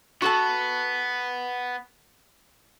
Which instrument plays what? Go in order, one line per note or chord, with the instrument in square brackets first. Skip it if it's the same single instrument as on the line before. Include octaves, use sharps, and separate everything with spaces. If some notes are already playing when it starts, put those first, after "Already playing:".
[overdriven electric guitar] B3 [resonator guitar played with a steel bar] F#4 A4 A5